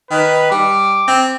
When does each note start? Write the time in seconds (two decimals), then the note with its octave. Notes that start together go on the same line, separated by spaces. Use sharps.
0.11 D#3 B4
0.51 G3 D6
1.07 C4